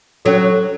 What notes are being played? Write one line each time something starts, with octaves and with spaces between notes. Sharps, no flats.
F#3 C#4 F#4 A4